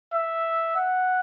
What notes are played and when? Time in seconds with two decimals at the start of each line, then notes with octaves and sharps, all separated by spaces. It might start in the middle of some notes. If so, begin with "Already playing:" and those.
0.14 E5
0.76 F#5